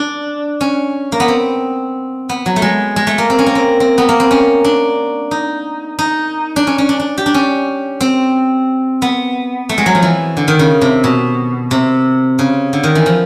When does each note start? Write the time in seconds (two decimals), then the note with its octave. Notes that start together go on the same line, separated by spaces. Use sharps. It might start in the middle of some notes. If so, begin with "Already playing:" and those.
Already playing: D4
0.61 C#4
1.12 A#3
1.20 B3
1.28 C4
2.29 B3
2.46 F#3
2.56 A3
2.62 G#3
2.96 G#3
3.07 A3
3.18 A#3
3.30 C4
3.39 C#4
3.46 A#3
3.55 C4
3.80 C4
3.98 B3
4.09 A#3
4.20 C4
4.31 C#4
4.64 D4
5.31 D#4
5.99 D#4
6.56 D4
6.67 C#4
6.78 C#4
6.89 D4
7.00 D4
7.18 G4
7.26 D4
7.34 C#4
8.01 C4
9.02 B3
9.69 A3
9.78 G#3
9.86 F#3
9.95 F3
10.02 E3
10.37 D3
10.48 D#3
10.59 C#3
10.81 C3
11.04 B2
11.71 C3
12.39 C#3
12.73 D3
12.84 D#3
12.95 E3
13.06 F3